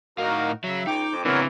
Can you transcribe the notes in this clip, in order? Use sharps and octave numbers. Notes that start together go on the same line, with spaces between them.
A2 D#4 F#4 A#4 F5
C#3 F#3 E5
C#2 D#4 G5 D6
F2
C#3 E3 B3 C4 D4 A#4 C#5